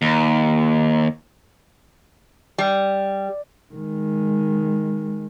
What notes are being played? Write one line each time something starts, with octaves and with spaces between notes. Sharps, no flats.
D#2
G3
D#3 G#3